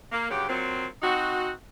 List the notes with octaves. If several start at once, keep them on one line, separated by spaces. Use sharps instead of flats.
A#3
G2 C#3 F#3 G4
A#2 F#3 C4
C4 D#4 F#4